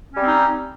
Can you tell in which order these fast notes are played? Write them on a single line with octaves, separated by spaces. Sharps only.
C#4 G3 C4 D#4